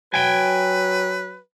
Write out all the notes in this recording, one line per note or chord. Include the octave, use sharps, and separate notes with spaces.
F#3 B4 G5 G#5